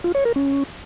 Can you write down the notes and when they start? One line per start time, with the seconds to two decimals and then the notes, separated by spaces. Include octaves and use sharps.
0.04 F4
0.15 C#5
0.25 A#4
0.36 C#4